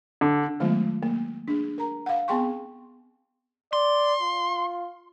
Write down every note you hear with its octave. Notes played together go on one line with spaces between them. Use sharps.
D3
D#3 F#3 G#3 A3 B3 F4
A#3
D4 G#4
A#4 A#5
F5 F#5
B3 C4 G#4 G5 C6 C#6
D5 C6
F4